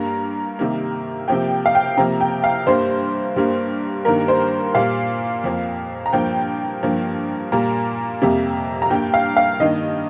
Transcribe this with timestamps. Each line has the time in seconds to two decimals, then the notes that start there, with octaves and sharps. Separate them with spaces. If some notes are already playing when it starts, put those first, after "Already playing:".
Already playing: G2 G3 A#3 A#5
0.59 C3 D#3 G3 A#3
1.28 C3 F3 A#3 G5
1.66 F5
1.75 G5
1.97 C3 F3 A#3 A#5
2.21 G5
2.44 F5
2.67 G2 G3 A#3 C5
3.36 G2 G3 A#3
4.05 G2 D#3 G3 A#3 A#4
4.28 C5
4.75 A#2 G3 A#3 F5
5.44 F2 F3 A#3
6.06 A#5
6.13 G2 F3 A#3 G5
6.83 G2 F3 A#3
7.52 A#2 G3 A#3 A#5
8.22 F2 C3 G3 A#3
8.82 A#5
8.90 G2 G3 A#3 G5
9.14 F5
9.37 F5
9.60 G2 D#3 A#3 D#5